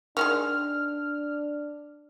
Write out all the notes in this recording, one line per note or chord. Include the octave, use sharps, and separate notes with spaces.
D#3 F#3 G#3 D4 F6